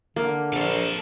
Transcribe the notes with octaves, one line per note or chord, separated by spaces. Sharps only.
D3 A#3
A#1 A4 F5